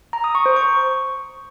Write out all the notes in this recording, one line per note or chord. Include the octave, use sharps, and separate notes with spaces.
A#5
D#6
C#6
C5
C#6